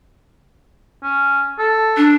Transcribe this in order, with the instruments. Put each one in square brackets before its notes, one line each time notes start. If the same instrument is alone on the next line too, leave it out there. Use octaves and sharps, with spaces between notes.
[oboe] C#4
A4
[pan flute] D4